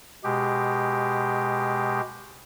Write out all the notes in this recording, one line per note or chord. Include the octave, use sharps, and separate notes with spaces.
B2 G#3 G4